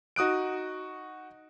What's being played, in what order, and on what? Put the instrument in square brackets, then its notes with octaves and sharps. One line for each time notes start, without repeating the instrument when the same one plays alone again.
[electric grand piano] D#4 F#4 D#6 F#6 D7